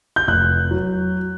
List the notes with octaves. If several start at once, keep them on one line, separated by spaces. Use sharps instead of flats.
G6
F1 F#6
F#3